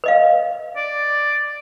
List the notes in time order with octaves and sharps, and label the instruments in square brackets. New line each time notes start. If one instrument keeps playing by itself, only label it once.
[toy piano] B4 D#5 F5
[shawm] D5